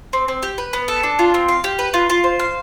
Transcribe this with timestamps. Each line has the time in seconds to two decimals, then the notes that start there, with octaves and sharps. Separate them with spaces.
0.13 C4
0.28 C4
0.43 G4
0.58 B4
0.73 B3
0.88 A4
1.03 D4
1.19 F4
1.34 C4
1.49 F5
1.64 G4
1.79 B4
1.94 F4
2.10 F4
2.24 C5
2.39 F5